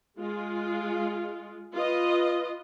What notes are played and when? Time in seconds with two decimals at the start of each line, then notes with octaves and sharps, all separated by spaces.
0.18 G#3 F4
1.74 F4 B4 D#5